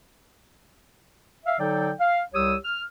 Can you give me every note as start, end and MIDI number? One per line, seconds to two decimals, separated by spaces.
1.45 1.55 76
1.45 1.55 77
1.59 1.91 50
1.59 1.91 54
1.59 1.91 63
1.59 1.91 69
1.59 1.91 74
1.59 1.91 79
2.00 2.20 77
2.34 2.55 36
2.34 2.55 55
2.34 2.55 67
2.34 2.55 73
2.34 2.55 87
2.34 2.55 88
2.63 2.81 89